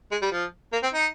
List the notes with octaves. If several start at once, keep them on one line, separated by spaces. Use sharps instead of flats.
G#3
G3
F3
A#3
C4
D#4